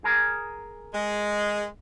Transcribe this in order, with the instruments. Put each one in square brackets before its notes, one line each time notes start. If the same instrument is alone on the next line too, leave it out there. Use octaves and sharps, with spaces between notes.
[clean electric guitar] G#4 A#4
[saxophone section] G#3